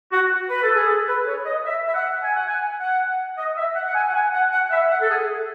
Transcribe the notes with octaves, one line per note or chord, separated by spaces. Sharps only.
F#4
B4
A4
G#4
A4
B4
C#5
D#5
E5
E5
F#5
G#5
F#5
G#5
F#5
D#5
E5
F#5
F#5
G#5
F#5
G#5
F#5
F#5
E5
F#5
A4
G#4